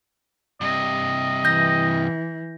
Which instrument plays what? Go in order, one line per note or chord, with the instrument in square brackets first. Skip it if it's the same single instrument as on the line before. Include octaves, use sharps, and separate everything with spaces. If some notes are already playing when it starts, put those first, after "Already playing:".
[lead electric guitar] G2 C3 [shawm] D#5
[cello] E3 [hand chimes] G6 A#6